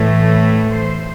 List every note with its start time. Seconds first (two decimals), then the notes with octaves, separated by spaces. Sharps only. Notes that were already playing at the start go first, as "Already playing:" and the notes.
Already playing: A2 E3 A3
0.69 C5